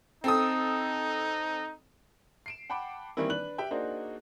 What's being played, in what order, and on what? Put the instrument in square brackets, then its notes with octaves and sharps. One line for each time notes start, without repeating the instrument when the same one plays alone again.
[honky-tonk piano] C4 A4 D#6 [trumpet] D#4
[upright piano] C7 D7 E7
F#5 G5 A5 B5 D6
D#3 E3 G3 A#3 C4 E4
D4 B4 F#6 F#7
G4 E5 G5
A#3 D4 D#4 F#4 G#4 C5